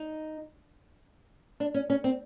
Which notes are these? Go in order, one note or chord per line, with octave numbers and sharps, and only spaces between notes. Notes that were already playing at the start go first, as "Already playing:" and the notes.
Already playing: D#4
D4
C#4
C#4
C4